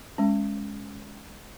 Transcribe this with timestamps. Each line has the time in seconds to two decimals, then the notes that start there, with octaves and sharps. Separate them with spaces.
0.18 G#3 C#4